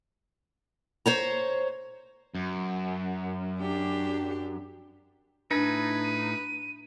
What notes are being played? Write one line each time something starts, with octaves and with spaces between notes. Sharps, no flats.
C5 C#5 A#5
F#2
D4 G4
A2 D4 D#4 B4 G#6
D#7